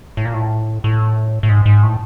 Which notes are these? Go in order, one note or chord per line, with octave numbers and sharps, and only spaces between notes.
A2
A#2
A2
A2
A2
G#2
G#2
A2